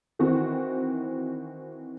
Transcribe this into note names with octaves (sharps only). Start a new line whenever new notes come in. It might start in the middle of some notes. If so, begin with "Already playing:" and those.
D#3 E3 C4 F#4